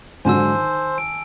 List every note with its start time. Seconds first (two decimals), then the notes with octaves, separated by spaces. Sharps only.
0.25 G#2 D3 F#3 C5 G#5 A5 E6
0.54 D#3
0.98 D7